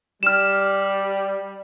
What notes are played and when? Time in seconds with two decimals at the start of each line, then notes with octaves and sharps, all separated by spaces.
0.23 G3 F6 E7